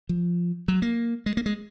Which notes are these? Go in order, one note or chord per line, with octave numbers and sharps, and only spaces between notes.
F3
F#3
A#3
G#3
A#3
G#3